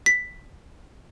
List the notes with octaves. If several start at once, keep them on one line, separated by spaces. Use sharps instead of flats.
B6